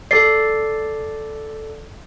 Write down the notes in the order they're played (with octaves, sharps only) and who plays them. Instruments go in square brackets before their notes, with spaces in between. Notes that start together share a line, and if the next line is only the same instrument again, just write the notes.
[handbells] A4 D5 [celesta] C7